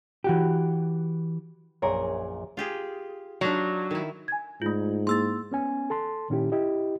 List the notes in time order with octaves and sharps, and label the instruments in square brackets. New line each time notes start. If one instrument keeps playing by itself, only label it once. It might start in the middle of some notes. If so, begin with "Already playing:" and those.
[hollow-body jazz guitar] E3 F#4 G4
[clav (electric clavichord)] A#1 F#2 A#2 [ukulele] G#4 A#4 C#5
[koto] F4 G4 G#4
[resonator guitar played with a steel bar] F#3 [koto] D4 D#4 F4
[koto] D#3 E4
[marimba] G#5 G#6
[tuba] G#2 [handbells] A3 F4
[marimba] A#3 E4 G#4 [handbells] C6 E6 A6
[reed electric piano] B3 C#4 G#5
A4 A5 C6
A#2 D#3 C#4 E4 G4
E4 G4 D#5